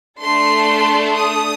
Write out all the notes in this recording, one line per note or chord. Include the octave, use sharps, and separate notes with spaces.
A3 D4 A4 C6
D#6